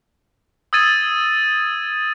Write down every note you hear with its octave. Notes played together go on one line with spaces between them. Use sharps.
D#6 E6 G#6 A6 D#7